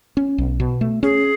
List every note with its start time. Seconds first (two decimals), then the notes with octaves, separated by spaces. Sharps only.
0.17 C#4
0.38 B1
0.60 B2
0.81 A3
1.03 C#4 G#4